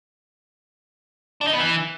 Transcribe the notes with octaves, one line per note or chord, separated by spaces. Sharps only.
D4
D#4
B3
E3